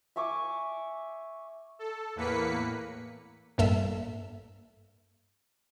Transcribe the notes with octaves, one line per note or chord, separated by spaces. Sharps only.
E5 G#5 C#6 D6
A4
E2 A2 A#3 B4 B6 C#7
A1 G2 A#3 A4 E5 E6